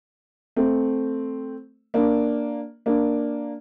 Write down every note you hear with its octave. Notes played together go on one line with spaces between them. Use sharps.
A3 C4
A#3 D4
A#3 D4